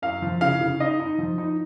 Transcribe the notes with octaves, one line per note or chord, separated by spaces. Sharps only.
F#2 F5
F3
C#3 F5
C#3
D#4 D#5
D#4
F3
D#4